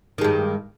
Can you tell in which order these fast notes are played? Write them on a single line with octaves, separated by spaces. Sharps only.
D#3 G#3 G2